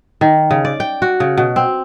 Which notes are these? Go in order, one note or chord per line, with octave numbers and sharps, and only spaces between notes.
D#3
C#3
D5
G5
F#4
C#3
B2
C4